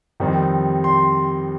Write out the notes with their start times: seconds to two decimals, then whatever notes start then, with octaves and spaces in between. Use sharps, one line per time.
0.20 F2 D#3 G3 C4 D#4
0.84 C6